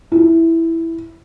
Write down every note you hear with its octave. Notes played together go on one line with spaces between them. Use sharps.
E4